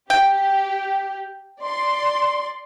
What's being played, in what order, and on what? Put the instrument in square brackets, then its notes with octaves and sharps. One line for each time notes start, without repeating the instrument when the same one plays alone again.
[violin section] G4 [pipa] G5
[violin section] D5 C6